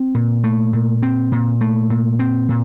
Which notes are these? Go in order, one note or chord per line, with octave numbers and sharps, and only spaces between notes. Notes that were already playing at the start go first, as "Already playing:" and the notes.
Already playing: C4
A#2
A3
A#2
C4
A#2
A3
A#2
C4
A#2